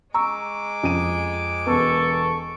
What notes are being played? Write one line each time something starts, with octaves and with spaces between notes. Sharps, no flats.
G#3 A#5 C#6 D6 E6
F2 D#7
E1 B3 A4 C#6